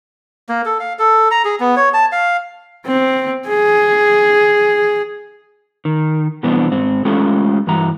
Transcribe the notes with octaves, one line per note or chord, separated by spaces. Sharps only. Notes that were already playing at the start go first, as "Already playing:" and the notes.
A#3
A4
F5
A4
A#5
G#4
B3
C#5
A5
F5
C4
G#4
D#3
B2 E3 G3 B3 C4 D4
G#2 C4
G#3 A3 C#4 F4 G4 A4
G2 E3 F#4 A#5